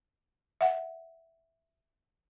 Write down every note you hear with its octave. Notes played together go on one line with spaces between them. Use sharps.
E5 F#5